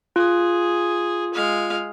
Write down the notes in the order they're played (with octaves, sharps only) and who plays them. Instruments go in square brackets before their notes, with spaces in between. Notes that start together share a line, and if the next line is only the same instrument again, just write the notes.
[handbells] F4 [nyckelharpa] G#4
[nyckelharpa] G#3 F5